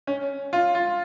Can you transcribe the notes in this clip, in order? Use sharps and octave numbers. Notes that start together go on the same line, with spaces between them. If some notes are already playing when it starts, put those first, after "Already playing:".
C#4
F4
F4